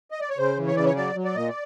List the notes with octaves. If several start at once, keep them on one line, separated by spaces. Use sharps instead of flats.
D#5
D5
C#5
C#3 C5
E3
C#5
C#3 D5
C#5
F#3 D5
F#3
D5
A#2 D#5
D5